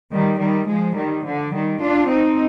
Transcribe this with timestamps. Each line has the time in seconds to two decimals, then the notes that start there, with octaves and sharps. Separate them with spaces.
0.13 D#3 G3
0.40 D#3 G3
0.69 F3 G#3
0.97 D#3 G3
1.25 D3 F3
1.53 D#3 G3
1.81 D4 F4
2.10 C4 D#4